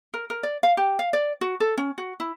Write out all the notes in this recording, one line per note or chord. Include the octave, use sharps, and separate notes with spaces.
A#4
A#4
D5
F5
G4
F5
D5
F#4
A4
C#4
F#4
E4